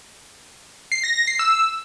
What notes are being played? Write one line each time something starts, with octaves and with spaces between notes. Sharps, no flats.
C7
A#6
A#6
C7
E6